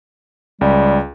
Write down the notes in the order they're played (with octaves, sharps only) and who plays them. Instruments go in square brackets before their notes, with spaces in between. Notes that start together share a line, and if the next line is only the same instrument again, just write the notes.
[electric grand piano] C#2 [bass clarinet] G3